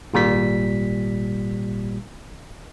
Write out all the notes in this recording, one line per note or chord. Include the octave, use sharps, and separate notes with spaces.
G#1 A#2 G3 B6